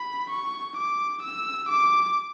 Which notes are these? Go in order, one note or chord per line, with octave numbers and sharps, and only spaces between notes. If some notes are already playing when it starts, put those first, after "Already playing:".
Already playing: B5
C#6
D6
E6
D6